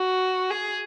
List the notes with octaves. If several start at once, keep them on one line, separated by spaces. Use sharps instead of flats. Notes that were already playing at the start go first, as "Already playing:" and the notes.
Already playing: F#4
G#4